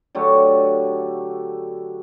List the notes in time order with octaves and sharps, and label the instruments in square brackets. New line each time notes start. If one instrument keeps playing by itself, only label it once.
[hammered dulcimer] D3 F#3 A3 G4